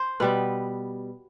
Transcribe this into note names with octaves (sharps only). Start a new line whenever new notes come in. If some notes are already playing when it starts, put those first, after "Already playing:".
Already playing: C5
B2 G3 B3 B4